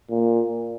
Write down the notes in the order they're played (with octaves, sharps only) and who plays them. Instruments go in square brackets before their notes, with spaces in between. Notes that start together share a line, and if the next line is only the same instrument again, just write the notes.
[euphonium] A#2